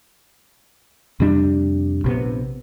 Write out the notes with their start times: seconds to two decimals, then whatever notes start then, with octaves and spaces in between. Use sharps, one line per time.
1.20 F2 C3 G3 D4
2.04 A#1 C3 B3